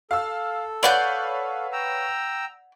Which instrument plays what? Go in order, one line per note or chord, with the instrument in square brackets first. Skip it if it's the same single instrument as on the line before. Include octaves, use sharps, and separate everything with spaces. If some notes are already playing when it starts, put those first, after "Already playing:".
[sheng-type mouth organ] A4 [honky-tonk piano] F5 E6
[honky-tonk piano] B4 C#5 F5 [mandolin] D5 F#5 G6
[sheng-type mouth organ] G5 A#5 E6